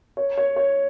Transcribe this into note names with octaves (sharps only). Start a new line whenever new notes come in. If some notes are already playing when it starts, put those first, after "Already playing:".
C#5
C#5
C#5